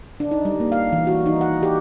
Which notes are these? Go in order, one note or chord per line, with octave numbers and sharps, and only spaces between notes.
D4
D#4
G3
A#3
F5
E3
F#4
D#4
F#5
G4